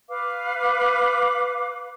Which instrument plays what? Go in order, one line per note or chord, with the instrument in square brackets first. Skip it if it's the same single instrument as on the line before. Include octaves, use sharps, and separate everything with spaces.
[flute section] B4 F5 D6